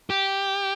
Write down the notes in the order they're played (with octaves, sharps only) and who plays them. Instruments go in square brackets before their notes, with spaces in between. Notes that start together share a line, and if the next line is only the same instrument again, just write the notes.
[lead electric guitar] G4